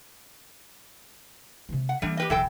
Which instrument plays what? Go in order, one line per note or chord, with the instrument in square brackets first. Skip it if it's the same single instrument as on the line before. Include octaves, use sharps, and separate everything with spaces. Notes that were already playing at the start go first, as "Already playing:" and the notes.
[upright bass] C3 G#3
[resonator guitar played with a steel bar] F#5
[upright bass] E3 A#3 [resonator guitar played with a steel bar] G3 A3 D4
[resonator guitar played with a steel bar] G4 B4 D#5
[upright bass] D1 B1 [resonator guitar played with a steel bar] E3 A4 G5